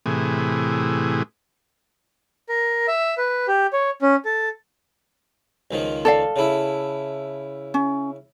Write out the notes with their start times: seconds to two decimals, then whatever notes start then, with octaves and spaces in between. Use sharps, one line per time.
0.06 A2 C3 E3 G#4
2.49 A#4
2.88 E5
3.18 B4
3.48 G4
3.73 C#5
4.02 C#4
4.25 A4
5.71 C#2 D#3 F3
6.05 A4 D5 F5
6.36 C#3 E4
7.74 C#4